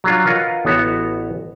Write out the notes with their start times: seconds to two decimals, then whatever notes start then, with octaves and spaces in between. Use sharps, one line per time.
0.04 F#3 D4 F4
0.26 F4 A#4 B4 C#5 D#5 F#5
0.65 A1 B3 F#4 C#5 E5